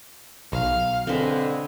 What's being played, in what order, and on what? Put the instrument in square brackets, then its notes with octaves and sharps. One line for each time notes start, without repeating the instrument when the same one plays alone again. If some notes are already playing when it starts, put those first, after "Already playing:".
[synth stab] B1 [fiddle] F5
[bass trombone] D3 [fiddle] G#3 [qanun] C4 B4